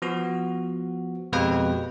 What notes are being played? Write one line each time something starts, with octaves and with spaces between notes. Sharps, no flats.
F3 B3 F#4
F2 B2 G#3 G4 B4 G5